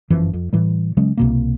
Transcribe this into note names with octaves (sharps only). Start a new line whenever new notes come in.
G1 F#2 E3 F3
F2
A2 E3 G3
C#3 F#3 G#3 C#4
C2 B2 A#3